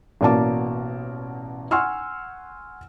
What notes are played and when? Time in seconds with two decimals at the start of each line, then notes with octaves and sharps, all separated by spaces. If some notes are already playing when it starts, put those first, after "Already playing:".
0.21 A1 B2 A#3 D5 A5 D6
1.71 F#5 G#5 C6 C#6 E6 F6